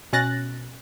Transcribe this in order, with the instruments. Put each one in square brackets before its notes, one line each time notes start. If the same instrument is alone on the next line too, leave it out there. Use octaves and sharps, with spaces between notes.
[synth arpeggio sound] B2 C#4 F#6 A6 A#6